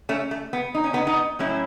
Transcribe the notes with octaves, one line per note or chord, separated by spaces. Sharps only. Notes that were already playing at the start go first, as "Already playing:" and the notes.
A3 C#4
A3
B3
D#4
C#4
B3 D#4
B3 D#4
A2 F#3 A3 C#4 E4